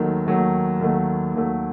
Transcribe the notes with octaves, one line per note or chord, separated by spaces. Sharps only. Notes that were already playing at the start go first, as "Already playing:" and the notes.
Already playing: D#2 D#3 F#3 A3
D#2 D#3 F#3 A3
D#2 D#3 F#3 A3
D#2 D#3 F#3 A3